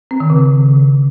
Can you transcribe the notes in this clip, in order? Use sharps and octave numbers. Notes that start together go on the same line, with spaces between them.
C4
D#3
C#3